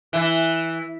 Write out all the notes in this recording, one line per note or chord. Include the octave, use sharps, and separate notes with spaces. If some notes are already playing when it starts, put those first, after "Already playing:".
E3